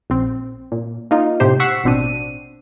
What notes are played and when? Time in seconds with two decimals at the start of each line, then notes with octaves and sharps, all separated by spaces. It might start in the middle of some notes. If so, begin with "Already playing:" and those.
0.10 A#1 C4
0.72 A#2
1.11 A#3 D#4 F4
1.40 A2 C3 G4 C5
1.60 F#5 C#6 E6 B6 C7
1.84 A1 B2 C4 D4 D#7